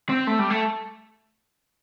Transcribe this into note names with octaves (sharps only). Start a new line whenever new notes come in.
C4
A3
G3
A3